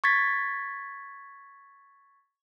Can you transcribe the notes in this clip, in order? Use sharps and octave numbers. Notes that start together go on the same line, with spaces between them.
C#6 G#6 A6 B6